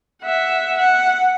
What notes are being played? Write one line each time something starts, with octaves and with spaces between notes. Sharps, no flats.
E5 F#5
F#5